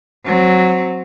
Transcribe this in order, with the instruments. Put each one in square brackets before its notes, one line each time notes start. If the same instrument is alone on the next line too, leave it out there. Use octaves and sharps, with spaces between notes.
[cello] F#3 C4